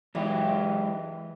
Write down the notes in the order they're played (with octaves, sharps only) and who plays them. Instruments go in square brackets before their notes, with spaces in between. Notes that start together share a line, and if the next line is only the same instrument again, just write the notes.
[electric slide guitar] F#2 G#3 G4 [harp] E3